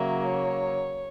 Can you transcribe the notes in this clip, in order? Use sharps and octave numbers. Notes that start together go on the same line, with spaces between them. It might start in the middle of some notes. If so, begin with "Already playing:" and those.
Already playing: C#3 F#3 A#3 E5
C#5